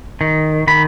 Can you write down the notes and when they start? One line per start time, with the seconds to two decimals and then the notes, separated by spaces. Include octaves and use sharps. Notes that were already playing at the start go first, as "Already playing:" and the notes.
0.21 D#3
0.67 D#3 B5